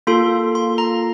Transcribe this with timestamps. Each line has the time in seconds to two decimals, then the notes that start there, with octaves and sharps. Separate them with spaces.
0.07 A#3 F4 A4 C6
0.55 C6
0.78 A#5